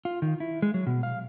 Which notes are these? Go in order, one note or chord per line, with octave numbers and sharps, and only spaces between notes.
F4
D#3
E4
G#3
F#3
B2
F5